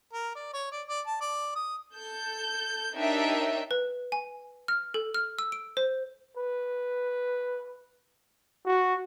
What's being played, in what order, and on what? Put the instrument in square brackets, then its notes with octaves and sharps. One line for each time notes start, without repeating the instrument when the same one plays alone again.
[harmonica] A#4
D5
C#5
D5
D5
A5
D5
D#6
[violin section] A4 G6
D4 D#4 G4 A#4 C#5 E5
[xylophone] B4
G#5
F6
A4
F6
E6
D7
C5
[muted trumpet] B4
F#4